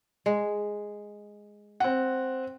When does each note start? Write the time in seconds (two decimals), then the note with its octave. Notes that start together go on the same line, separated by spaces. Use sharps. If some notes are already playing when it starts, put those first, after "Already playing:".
0.26 G#3
1.80 C4 F#5